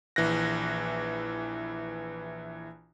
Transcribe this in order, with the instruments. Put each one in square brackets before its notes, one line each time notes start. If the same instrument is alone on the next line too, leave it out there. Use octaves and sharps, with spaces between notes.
[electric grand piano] A#1 E3 F#6 A#6